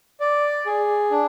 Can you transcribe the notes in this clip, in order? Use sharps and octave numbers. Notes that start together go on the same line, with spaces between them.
D5
G#4
D4